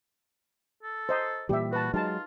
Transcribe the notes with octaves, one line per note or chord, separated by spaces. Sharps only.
A4
C5 D#5 A#5
A#2 E3 G3 G4 E5
F#4 B4 A5
F#3 G#3 D#4 F4 A5